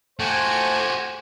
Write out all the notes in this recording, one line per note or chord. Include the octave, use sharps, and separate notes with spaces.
A3 F#4 G4 C5 G#5